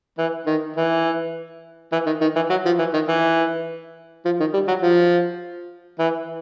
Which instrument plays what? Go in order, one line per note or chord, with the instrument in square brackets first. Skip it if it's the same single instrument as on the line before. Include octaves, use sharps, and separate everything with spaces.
[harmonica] E3
D#3
E3
E3
D#3
D#3
E3
F#3
F3
E3
D#3
E3
F3
D#3
G3
F#3
F3
E3